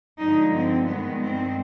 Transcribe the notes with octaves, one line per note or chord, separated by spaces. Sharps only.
G2 D3 F3 G#3 D#4
C4
G2 D#3 G#3 B3
C4